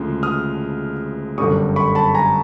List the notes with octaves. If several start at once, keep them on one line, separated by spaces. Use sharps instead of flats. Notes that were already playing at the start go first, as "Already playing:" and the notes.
Already playing: D2 C#3 F3 G#3
D#6 F6
G1 F#2 D3 G3 C#6 D#6
B5 C#6
A5 B5
G#5 A#5